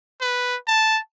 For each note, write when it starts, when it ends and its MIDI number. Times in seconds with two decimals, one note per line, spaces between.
0.21 0.56 71
0.67 0.99 81